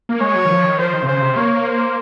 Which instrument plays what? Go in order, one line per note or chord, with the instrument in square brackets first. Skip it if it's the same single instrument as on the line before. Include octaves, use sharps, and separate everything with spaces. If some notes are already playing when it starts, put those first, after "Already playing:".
[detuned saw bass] A#3
[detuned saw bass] G#3 [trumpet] C#5
[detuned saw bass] F#3
D#3
F3
D#3
[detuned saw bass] F3 [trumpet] C5
[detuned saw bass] D#3
C3
[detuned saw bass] C#3 [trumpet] C5
[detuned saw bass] C3
[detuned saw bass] A#3 [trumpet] C#5
[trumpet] C5